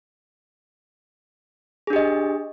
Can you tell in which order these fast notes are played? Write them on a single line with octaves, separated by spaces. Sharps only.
G#4 D4 G4 D#5